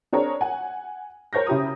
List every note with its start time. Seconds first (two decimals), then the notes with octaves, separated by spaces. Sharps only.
0.12 C4 D4 G#4 A#4 C#5 A#5
0.41 F#5 G#5
1.33 A#4 C5 C#5 G6 A#6
1.47 C#3 E4 G4 A#5 D#6